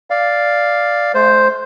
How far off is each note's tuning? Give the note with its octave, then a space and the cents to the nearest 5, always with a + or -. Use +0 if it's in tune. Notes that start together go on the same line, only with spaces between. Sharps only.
D5 +0 F5 +0
A3 -40 C5 +0